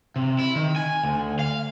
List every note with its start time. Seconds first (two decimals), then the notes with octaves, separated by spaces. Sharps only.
0.16 C3
0.39 E4
0.56 D#3
0.76 G#5
1.03 D2
1.39 F5